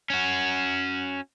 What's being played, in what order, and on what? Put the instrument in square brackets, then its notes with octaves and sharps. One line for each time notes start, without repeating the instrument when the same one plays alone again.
[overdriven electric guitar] C#4 F#4